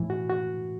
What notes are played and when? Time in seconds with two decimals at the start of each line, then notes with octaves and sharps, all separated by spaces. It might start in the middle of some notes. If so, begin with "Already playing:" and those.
Already playing: A2 E3
0.10 F#4
0.30 F#4